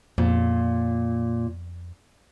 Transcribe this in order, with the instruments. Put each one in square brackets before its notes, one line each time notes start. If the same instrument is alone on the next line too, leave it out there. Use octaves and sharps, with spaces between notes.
[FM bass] F2 [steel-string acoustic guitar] A#2